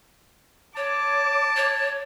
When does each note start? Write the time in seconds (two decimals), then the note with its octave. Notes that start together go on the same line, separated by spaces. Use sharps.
0.77 C#5 A5 D6
1.57 C#5